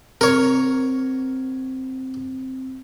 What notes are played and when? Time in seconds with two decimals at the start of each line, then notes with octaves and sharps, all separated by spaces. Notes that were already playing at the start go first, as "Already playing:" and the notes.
0.21 C4 A#4 C#5